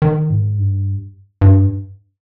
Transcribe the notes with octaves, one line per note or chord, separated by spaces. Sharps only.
D#3
G#2
G2
G2